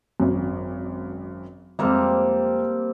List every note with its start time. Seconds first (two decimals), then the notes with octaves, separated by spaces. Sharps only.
0.20 G#1 F#2
1.79 F2 C3 G3 G#3 A#3